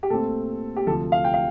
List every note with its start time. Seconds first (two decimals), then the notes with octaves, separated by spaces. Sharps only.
0.03 G4
0.10 A#2 A3 C4 A4
0.76 G4
0.87 D2 C3 F3 A4
1.12 F5
1.24 G5
1.34 F5